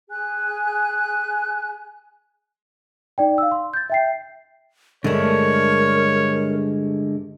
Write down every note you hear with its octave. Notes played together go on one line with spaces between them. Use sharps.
G#4 G#5 F#6
D#4 D5 G5
F5 E6
C6
G6 A6
E5 G5 C7
G2 D3 G#3 A3 D4 A#4 C#5